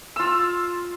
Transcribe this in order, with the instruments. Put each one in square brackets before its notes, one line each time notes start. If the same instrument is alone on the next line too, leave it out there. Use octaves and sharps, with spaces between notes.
[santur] F4 E6